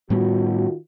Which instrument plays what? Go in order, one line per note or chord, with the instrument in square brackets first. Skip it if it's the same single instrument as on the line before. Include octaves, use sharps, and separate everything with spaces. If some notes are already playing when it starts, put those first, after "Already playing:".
[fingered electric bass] A2 G3 B3 [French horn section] D#3 F4 F#4